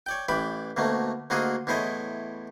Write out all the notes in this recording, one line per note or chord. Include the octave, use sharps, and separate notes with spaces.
C#5 D5 G5
A1 E3 D5 G5 B5
D2 B2 A3 A#3
D2 A#3 F4 F#4 G#4 D#5
E2 A2 E4 C5 C#5 D#5